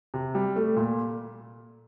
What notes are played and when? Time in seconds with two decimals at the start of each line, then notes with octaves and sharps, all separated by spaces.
0.14 C3
0.35 G3
0.56 A3
0.76 A#2